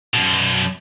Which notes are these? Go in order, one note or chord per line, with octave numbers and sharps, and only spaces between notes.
F#2 B2